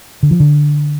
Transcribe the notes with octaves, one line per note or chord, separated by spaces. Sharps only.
D3
F3
D3